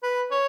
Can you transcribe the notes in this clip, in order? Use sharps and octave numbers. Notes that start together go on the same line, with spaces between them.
B4
C#5